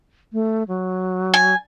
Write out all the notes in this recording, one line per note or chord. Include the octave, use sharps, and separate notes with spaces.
A3
F#3
G#5